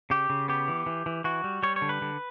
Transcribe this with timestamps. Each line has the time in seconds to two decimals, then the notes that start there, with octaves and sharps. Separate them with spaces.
0.10 C#3 G4
0.30 C#3
0.48 B3 G4
0.68 E3
0.86 E3
1.06 E3
1.24 E3 F#4
1.44 G3
1.63 G3 C#5
1.76 C#5
1.82 D3
1.89 B4
2.02 D3